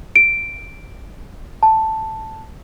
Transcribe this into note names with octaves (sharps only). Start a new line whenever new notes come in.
D7
A5